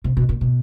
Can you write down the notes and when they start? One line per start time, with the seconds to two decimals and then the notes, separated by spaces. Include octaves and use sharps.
0.04 C3
0.17 B2
0.29 A#2
0.41 B2